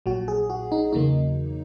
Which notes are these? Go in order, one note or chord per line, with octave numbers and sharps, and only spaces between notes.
A#1 A#2 F#3 F#4
G#4
F#4
D#4
E2 C#3 F#3 A#3 D#4